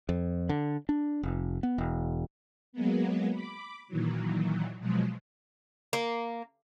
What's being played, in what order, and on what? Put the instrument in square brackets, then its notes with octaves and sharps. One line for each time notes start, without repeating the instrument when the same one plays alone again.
[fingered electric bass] F2
D3
D4
F1
B3
E1
[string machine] F#3 G#3 A#3 B3
B5 D6
A#2 D#3 E3 F#3
B2 F3 F#3 G#3
[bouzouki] A#3